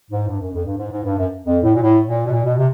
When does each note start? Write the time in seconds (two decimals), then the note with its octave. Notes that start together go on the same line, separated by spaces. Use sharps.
0.11 G#2
0.28 G2
0.40 F#2
0.53 F2
0.65 G2
0.78 G#2
0.91 G#2
1.04 G2
1.17 F#2
1.46 F2
1.63 A2
1.74 A#2
1.81 A2
2.06 A#2
2.26 B2
2.32 A#2
2.45 B2
2.58 C3